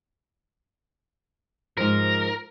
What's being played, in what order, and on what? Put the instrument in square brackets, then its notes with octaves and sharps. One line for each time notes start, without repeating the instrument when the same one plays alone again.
[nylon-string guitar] G#2 F3 [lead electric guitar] A#4